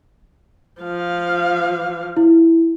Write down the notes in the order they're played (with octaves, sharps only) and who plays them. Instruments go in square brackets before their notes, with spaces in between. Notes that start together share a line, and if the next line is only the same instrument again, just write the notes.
[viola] F3 F5
[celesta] E4